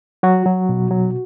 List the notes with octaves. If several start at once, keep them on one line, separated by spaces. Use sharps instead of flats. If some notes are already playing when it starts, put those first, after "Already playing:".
F#3 F#4
F#3
B2
F#3